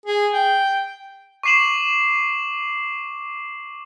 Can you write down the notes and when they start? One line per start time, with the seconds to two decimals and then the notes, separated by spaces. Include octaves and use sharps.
0.06 G#4
0.34 G5
1.43 C#6 D6 C7 E7 F#7